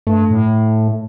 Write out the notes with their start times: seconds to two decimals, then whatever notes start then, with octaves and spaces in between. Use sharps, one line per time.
0.07 G2 A3
0.30 A2